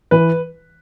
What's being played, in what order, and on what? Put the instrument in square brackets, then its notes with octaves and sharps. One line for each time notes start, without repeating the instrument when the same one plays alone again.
[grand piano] E3 [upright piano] B4